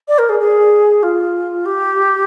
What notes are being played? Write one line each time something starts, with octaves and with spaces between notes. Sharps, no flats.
D5
A#4
G#4
G#4
F4
G4